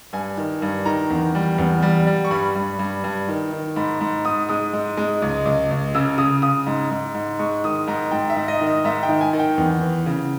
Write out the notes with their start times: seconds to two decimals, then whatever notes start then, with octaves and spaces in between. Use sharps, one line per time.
0.13 G2 G#5
0.38 D#3
0.62 G2
0.85 D#3 A#5
1.10 E2
1.35 G3
1.58 E2
1.82 G3
2.07 G3
2.25 C#6
2.31 G2 B5
2.55 G2
2.79 G2
3.04 G2
3.28 D#3
3.52 D#3
3.76 G#2 B5
4.01 G#2
4.25 G#2 D#6
4.49 G#3 D#6
4.73 G#2
4.97 G#3
5.22 C#2
5.45 C#2
5.71 C#2
5.95 C#3 E6
6.18 C#3 D#6
6.42 C#3 D#6
6.66 G#2
6.90 G#2
7.15 G#2
7.39 G#3 C#6
7.64 D#3 D#6
7.87 G#2 A#5
8.11 G#2 G5
8.30 E5
8.36 G#2
8.48 D#5
8.61 D#3
8.67 D#5
8.84 G#2 E5
9.03 G5
9.09 D#3
9.21 G#5
9.33 D#3
9.39 G5
9.58 E2
9.81 E3
10.06 C#3